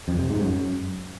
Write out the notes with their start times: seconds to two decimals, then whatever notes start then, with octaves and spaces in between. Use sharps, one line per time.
0.08 F2
0.19 C3
0.30 G#2
0.41 F#2